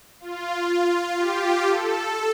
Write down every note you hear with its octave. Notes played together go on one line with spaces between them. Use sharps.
F4
G4
A4